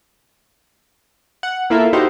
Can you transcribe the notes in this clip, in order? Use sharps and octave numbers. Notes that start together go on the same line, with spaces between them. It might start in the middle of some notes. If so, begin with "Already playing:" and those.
F#5
A#3 E4 F4 A4 A#4 E5
D#4 E4 F#4 G4 C5